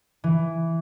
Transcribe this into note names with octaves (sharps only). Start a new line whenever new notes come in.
E3